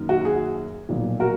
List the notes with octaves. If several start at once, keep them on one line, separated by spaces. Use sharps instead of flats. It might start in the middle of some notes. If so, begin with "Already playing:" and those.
Already playing: F#2 D#3 A#3
F#4
G#4
B1 A#2 F3
F#4 A#4